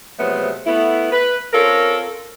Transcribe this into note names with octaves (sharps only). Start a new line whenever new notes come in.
C3 F3 F#3 G#3 A3 B3
A3 B3 E4
B4
C4 C#4 F4 A4 A#4